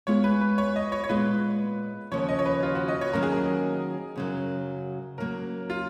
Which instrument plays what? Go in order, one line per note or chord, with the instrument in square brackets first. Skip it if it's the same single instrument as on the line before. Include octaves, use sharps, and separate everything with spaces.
[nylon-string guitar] G#3 B3 F4 G#4 [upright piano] C#5
[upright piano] B4
B4
C#5
D#5
C#5
C#5
[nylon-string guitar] A#2 G#3 B3 F4 [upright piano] B4
[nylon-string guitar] D#2 C#3 F3 [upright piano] C#5
[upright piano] D#5
C#5
B4
F4
F#4
D#5
C#5
[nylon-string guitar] D#3 F#3 A#3 C#4 F4 [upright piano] A#4
[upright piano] G#4
A#4
[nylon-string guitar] F#2 C#3 F#3
[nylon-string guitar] C#3 F#3 A#3 [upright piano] A#4
[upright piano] F4